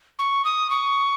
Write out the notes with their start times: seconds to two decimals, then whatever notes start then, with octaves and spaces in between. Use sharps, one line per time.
0.19 C#6
0.45 D#6
0.70 C#6